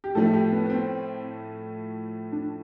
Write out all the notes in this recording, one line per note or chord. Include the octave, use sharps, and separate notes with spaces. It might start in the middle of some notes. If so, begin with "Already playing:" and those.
G4
A2 F3 A3 A4
G4
B3
B3
C4
D4